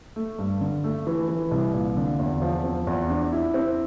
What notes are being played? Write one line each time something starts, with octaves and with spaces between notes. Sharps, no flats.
A3
G2
D3
A3
E3
E3
C2
A#2
D3
E2
F3
C4
E2
D4
E4
C4